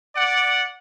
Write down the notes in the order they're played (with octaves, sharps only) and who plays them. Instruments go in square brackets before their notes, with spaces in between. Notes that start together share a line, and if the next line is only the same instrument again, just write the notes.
[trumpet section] D5 F#5